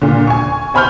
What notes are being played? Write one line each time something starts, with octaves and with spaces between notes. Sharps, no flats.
A#2 D3
G#5 C#6
C5 G#5 B5 C#6 F6 G6